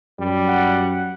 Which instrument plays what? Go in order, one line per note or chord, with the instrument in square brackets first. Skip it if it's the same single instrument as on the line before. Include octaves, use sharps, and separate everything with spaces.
[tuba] F#2 [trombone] G3
[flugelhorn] F#5